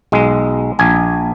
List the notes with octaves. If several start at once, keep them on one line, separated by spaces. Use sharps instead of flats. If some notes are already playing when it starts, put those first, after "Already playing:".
B1 G#3
A#1 G#5